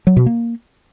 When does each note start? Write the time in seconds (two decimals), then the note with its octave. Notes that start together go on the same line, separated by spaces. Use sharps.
0.07 F#3
0.17 B2
0.26 A#3